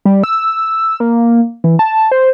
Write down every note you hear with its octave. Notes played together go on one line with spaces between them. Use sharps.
G3
E6
A#3
E3
A5
C5